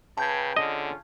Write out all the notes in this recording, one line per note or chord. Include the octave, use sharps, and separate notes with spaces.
C#3 B4 G5 A5 G6 G#6
D3 C#4 F4 G#4 D#5